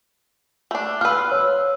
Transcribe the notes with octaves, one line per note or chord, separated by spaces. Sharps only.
A3 D4
F4 B4 E6 F6
C#5 E6